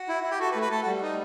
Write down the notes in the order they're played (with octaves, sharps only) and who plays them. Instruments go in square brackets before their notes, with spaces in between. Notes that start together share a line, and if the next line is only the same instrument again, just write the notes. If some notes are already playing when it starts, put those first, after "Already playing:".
Already playing: [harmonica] F#4
[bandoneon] E4
E4
[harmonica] G4
[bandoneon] F#4 [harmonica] A4
[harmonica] B4
[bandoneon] A3
[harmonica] B4
[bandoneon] A3 [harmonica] A4
[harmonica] F#4
[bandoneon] G3
[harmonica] D#4